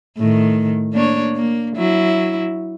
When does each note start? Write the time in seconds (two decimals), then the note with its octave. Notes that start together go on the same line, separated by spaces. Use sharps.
0.18 A2 D#3
0.93 A#3 D4 C#5
1.35 A#3
1.76 F#3 E4